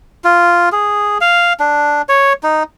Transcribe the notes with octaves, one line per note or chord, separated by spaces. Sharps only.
F4
G#4
F5
D4
C#5
D#4